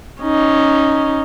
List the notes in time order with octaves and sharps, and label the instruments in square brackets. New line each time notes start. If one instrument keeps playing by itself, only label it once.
[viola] C#4 D#4